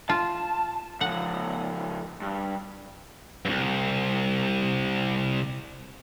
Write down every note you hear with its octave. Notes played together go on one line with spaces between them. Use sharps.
F4 A5
C#3 F3 F#5
G2
C2 G2